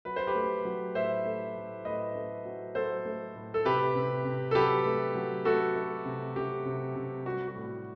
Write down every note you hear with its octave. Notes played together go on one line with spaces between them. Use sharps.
F#3 B4
C5
G4 B4
A3
F#3
A2 C5 E5
A3
A2
A2 B4 D#5
A3
F#3
F#3 A4 C5
A3
A2
A4
C3 G4 B4
C3
C3
A4
F#3 G4 B4
A3
F#3
A3 F#4 A4
A3
C3
C3 G4
C3
C3
G3 F#4
F#4
A2